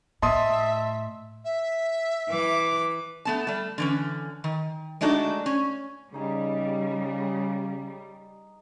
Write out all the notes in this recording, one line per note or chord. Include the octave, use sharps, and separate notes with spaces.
A2 D#5 E5 A5 C6 D#6
E5
E3 D6
A3 B3 A5
G3 A3
D3 E3 C#4
D#3
G#3 A3 D4 D#4 F#4
C#4
C#3 G3 D#4 G#4